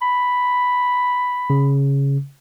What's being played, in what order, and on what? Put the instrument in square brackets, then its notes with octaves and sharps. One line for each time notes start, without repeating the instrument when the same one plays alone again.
[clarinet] B5
[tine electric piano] C#3